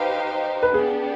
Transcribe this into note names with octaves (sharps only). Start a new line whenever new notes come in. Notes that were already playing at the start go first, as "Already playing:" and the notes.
Already playing: D#4 G4 B4 C5 F5
B4
B3 D4 G4 G#4